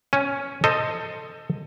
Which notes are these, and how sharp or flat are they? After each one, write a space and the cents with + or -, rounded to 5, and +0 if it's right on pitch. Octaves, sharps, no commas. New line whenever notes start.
C#4 +0 G#5 +0
A4 +20 C5 +0 D#5 +0